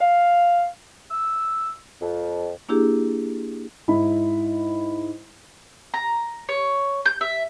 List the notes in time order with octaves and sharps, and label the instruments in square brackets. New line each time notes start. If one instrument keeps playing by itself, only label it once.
[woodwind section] F5
E6
F2
[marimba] A#3 D4 E4 G4 G#4
[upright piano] G#2 D#4 E4 B5
[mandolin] A#5
C#5
G6
E5